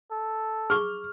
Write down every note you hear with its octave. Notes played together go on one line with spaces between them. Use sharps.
A4
G#4 C#6 D6 F6